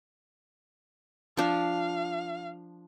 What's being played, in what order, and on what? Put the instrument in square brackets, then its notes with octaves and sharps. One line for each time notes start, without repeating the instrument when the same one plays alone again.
[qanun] F3 D4 [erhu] F5